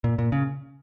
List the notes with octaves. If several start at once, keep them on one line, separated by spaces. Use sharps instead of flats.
A#2
A#2
C#3